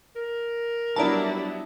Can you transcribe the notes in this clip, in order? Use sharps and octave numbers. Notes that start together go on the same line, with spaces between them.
A#4
F#3 G3 B3 D4 E4 D5 E5 A5